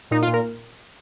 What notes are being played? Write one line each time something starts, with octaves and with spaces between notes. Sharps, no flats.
A#2 D#4
F4
A#2
A#4